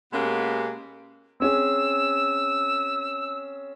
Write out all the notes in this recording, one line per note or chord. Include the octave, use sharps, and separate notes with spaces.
B2 G#3 A#3 B3 C#4 G4
C4 C#4 G#4 E6